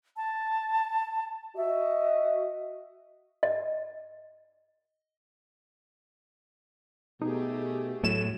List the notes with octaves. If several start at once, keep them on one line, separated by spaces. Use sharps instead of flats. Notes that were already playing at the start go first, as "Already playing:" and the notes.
A5
F#4 D#5 E5
D#5
B2 A3 D#4 G4 G#4
A2 F#3 A3 E7